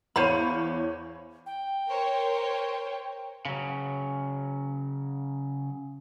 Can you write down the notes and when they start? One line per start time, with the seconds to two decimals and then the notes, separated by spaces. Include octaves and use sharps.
0.16 E2 C5 C#5 F5 B5 D#7
1.46 G5
1.90 A#4 C5 C#5
3.45 C#3 F#3